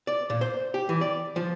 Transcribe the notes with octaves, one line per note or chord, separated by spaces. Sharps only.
D5
A#2
C5
G4
E3
D5
F3